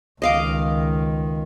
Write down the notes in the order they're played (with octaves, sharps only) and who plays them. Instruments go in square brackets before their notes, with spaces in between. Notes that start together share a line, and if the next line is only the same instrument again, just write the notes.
[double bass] C#2 D#3 [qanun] D#5 F5 D6